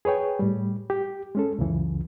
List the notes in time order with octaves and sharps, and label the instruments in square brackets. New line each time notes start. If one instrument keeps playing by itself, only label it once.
[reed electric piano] G#4 B4 C#5 G5
A2 G3
G4
G#3 C#4 A4
C#2 F#2 C#3 E3